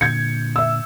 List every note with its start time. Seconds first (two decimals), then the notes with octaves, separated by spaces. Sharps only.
0.01 A#2 D3 G6 G#6 C#7
0.56 E5 E6